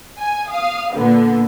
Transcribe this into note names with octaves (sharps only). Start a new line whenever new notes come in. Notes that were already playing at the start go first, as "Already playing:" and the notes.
G#5
F5 D#6
A#2 D3 B3